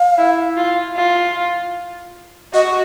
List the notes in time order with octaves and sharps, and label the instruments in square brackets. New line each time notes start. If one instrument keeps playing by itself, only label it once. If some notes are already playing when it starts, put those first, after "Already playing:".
Already playing: [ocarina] F5
[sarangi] E4
F4
F4
[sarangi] F#4 [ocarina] D#5